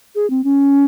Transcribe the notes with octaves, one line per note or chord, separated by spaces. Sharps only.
G#4
C4
C#4